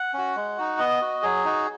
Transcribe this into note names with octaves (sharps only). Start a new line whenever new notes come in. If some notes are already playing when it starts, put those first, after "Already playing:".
Already playing: F#5
C#4 F#4
G#3
D#4 F#4
B3 D#5
F#4
F#3 G#4
D#4 F#4